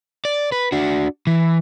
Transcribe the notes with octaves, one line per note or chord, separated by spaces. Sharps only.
D5
B4
D4 F#4
E3